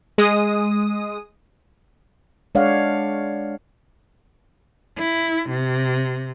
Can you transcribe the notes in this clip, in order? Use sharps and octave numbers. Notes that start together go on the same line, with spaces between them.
G#3 D#6
G#3 D4 C#5 D5 F5 F#5
E4
C3